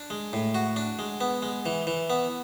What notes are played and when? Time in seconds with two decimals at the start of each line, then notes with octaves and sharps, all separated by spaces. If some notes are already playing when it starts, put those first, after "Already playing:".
Already playing: D4
0.10 G#3
0.33 A2
0.55 F#4
0.76 D4
0.99 G#3
1.21 B3
1.42 G#3
1.66 E3
1.87 E3
2.10 B3